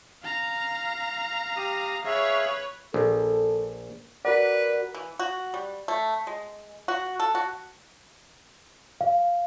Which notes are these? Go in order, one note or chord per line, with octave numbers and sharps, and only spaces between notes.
F5 A#5
G4 D#6
G#4 B4 C#5 E5 F5
A#1 A4
F#4 A#4 B4 D5 F#5
E3
F#4
G3
A3
G#3
F#4
A4
F#4
F5